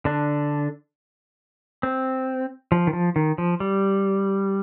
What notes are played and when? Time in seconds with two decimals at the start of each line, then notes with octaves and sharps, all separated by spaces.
0.05 D3 D4
1.83 C4
2.72 F3
2.87 D#3
2.93 F3
3.16 D#3
3.38 F3
3.60 G3